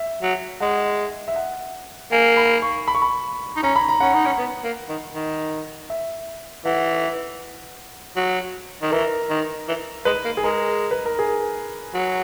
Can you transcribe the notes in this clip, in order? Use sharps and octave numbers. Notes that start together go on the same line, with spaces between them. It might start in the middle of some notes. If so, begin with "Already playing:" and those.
Already playing: E5
F#3
G#3 F#5
E5
F#5
A#3 G#5
B5
C#6
B5
C#6
B5
D#4
C#4 A#5
B5
A#5
C#4 F#5
D#4
C#4
B3
A#3
D#3
D#3
E5
E3 F#5
F#3
D#3
E3 A#4
D#3
E3
G#3 B4
A#3
G#4
G#3 A#4
B4
A#4
G#4
F#3